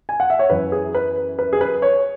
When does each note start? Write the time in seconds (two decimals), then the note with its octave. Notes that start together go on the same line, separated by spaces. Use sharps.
0.09 G#5
0.20 F#5
0.30 E5
0.39 C#5
0.50 F#2 E3 B4
0.72 G#4
0.95 B4
1.39 B4
1.53 G#4
1.61 B4
1.82 C#5